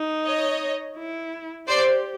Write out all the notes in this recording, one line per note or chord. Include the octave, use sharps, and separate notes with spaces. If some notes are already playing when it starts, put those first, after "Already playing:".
Already playing: D#4
C#5 D#5
E4
G4 C5 D5